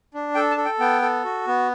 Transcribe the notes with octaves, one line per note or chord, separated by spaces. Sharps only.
D4
A4 G5
A5
A4
G5
B3 G5
A4
F#4
B3